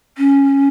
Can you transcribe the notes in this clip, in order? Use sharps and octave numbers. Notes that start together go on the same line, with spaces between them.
C#4